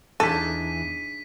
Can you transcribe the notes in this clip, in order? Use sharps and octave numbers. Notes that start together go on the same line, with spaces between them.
E2 D4 D#4 G#4 A4 B6 D#7